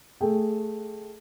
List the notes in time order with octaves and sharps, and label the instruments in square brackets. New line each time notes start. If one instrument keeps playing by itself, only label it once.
[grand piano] A3 G#4 G5